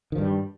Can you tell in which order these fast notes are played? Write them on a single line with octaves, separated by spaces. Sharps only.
D#3 F3 G2 G3